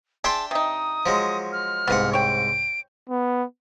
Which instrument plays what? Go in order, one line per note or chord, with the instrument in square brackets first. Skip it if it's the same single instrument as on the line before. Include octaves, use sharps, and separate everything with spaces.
[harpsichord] D4 E5 G5 [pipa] G#4 C6 [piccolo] A5
[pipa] C3 D#4 [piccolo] D#6
[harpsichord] F3 F#3 G#3
[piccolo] F6
[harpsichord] C2 G#2 F#5 [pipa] B3 F4
[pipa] C#5 G5 [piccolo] D7
[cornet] B3